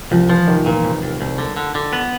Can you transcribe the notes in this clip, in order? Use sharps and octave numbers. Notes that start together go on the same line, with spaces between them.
C2 F3
E3 F3
C2 D#3
A#2 E3
C2
C2
C2
D3
D3
D3
B3